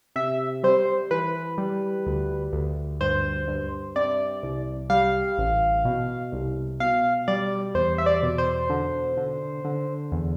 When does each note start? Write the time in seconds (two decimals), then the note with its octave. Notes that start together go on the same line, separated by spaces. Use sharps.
0.16 C3 E5
0.63 G3 C5
1.11 E3 B4
1.58 G3
2.06 D2
2.53 D2
3.01 G2 C5
3.48 G2
3.96 C3 D5
4.43 C2
4.90 G3 F5
5.38 A1
5.85 B2
6.32 C2
6.80 B2 F5
7.28 G3 D5
7.74 E2 C5
7.98 E5
8.06 D5
8.22 B2
8.38 C5
8.70 D3
9.17 D3
9.65 D3
10.12 E2